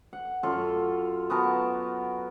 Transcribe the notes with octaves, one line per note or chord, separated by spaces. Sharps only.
F#5
F#2 F4 A4
B3 F#4 A#4 A5